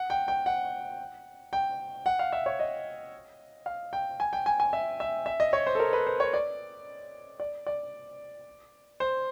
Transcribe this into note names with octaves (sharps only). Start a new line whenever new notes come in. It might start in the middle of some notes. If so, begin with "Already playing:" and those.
Already playing: F#5
G5
G5
F#5
G5
F#5
F5
E5
C#5
D#5
F5
G5
G#5
G5
G#5
G#5
E5
E5
E5
D#5
C#5
C5
A4
A#4
B4
C5
C#5
D5
D5
D5
C5